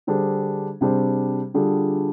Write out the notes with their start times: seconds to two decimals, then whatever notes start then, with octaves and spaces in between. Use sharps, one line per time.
0.07 D3 G3 D4 G#4 C5
0.81 C3 G3 D4 G#4 C5
1.54 D3 G3 D4 F4 G#4